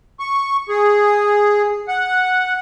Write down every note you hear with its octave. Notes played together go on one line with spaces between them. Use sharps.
C#6
G#4
F#5